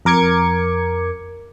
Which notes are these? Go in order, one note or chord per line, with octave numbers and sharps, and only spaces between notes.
F2 A#4 D6 G#6 C#7